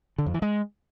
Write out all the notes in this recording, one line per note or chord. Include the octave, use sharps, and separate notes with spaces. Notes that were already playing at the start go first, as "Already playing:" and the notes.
D3
F2
E3
G#3